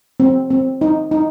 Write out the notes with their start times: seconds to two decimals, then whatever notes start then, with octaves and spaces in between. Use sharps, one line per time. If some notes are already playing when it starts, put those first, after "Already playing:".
0.20 C4
0.50 C4
0.81 D#4
1.11 D#4